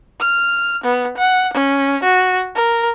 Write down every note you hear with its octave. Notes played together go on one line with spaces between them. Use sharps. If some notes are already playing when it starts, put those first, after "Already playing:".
F6
B3
F#5
C#4
F#4
A#4